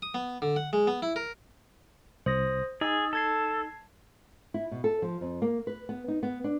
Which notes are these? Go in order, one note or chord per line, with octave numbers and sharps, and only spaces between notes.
D#6
B3
D3
F#5
G#3
B3
E4
A#4
C2 C5 D#6 A#6
D#4 G#4 E6 A6
A4 A5 G#6 C7
E4
B2
A4
F3
F2
A#3
B4
B3
D#4
B3
D4